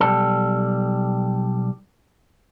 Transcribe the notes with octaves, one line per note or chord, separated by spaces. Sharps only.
B1 G3 A4